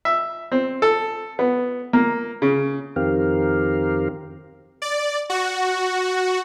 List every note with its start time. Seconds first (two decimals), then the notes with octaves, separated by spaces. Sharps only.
0.05 E5
0.52 C4
0.82 A4
1.39 B3
1.93 A#3
2.42 C#3
2.96 F2 D#3 C4 G4 A#4 F5
4.82 D5
5.30 F#4